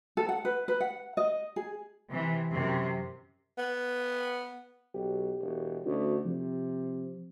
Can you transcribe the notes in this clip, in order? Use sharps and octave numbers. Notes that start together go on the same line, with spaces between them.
A4
F#5
B4
B4
F#5
D#5
G#4
C3 E3
F#2 C3
B3
B1 G4
E1
D2 C#4 D#4 F#4
C3 F3